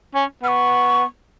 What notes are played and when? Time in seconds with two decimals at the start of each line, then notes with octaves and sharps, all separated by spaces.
0.14 C#4
0.43 B3 F6
0.48 C#6